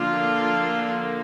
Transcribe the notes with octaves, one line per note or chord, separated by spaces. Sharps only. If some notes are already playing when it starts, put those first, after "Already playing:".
Already playing: D3 F3 A#3 D4 F4